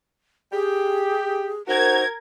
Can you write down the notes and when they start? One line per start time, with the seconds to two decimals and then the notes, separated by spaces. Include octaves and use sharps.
0.53 G4 G#4
1.68 D#4 F#4 A#4 C5 G#6